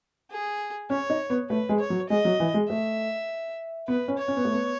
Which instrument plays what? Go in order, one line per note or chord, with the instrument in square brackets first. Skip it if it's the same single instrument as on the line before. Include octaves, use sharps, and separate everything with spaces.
[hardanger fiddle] G#4
[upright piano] C#4 [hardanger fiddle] C#5
[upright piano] D#4
B3
[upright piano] A3 [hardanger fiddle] B4
[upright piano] G#3
[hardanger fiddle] C#5
[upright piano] F#3
[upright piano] G#3 [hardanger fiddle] D#5
[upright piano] F#3
E3
G#3
[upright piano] A3 [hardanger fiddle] E5
[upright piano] B3 [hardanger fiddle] B4
[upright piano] C#4
[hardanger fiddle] C#5
[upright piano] C#4
B3
A3
B3